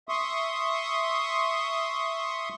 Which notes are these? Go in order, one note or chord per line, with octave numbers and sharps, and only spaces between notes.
E5 C6 C#6 D#6